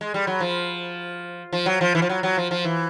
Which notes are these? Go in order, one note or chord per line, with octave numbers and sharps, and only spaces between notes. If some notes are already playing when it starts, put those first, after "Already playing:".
G#3
G3
F#3
F3
F3
F#3
F3
E3
F3
F#3
F#3
F3
F3
E3